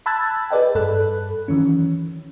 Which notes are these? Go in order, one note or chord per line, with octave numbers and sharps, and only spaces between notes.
A5 B5 E6 F#6 G#6 A6
G#4 B4 D5 D#5 G5
G2 A4 B5 F#6
D#3 E3 F#3 C#4